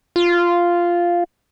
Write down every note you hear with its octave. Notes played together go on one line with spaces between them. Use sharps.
F4